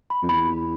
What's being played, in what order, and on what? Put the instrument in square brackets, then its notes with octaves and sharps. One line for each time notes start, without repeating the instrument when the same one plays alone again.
[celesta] B5
[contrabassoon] F2
[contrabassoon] E2 [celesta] B5